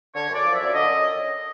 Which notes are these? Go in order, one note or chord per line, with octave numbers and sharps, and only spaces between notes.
D3 C#5
F#2
D5
F3
F#2 E5
D5
D3 D#5
F#2